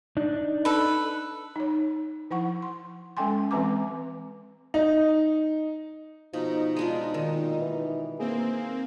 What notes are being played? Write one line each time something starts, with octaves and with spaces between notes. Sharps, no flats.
D4 D#4
A4 B4
D#4 C#5
F3 E4 F#5 C#6
C6
G#3 C#4 A4 G5 G#5 C6
E3 G#3 C4 B4 A#5 D6
D#4
B2 F3 D#4
G#3 D4 F4
A#2 D#3
E3
A#3 C4 G#4